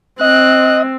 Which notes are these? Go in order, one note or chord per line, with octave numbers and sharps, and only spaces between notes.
C4 D#5 F#6